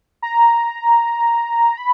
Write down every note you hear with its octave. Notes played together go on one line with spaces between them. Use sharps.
A#5
B5